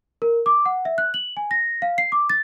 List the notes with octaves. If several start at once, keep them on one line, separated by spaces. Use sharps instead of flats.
A#4
D6
F#5
E5
F#6
F#7
G#5
A#6
F5
C7
D6
A6